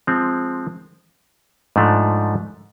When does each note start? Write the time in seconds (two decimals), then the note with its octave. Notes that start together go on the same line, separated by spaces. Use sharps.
0.07 F3 G#3 C4
1.76 G#2 F3 A3 D4